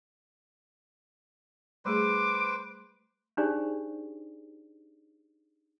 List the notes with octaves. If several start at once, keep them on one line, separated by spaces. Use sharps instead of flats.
G3 A3 G#4 B4 C5 D6
D4 D#4 G4 G#4 C5 D5